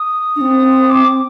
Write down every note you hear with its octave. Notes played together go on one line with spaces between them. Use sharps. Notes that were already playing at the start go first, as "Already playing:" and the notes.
Already playing: D#6
D4
C4
D6